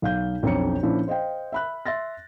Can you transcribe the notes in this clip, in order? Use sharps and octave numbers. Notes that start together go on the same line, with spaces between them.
B1 F5 G6
B1 F2 D4 C#5 A#5 C#7
A#2 F3 C#4 D4 E4
C5 D#5 F5 G5
E5 B5 F#6
E5 C6 A6 A#6